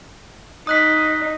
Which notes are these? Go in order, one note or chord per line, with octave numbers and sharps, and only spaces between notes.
D#4 D#6 F#6 B6